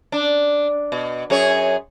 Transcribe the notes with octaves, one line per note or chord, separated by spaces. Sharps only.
D4
B2
F#2 G#4 C#5